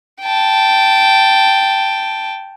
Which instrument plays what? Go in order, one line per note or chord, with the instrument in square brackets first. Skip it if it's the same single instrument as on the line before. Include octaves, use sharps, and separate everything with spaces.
[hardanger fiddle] G5 A5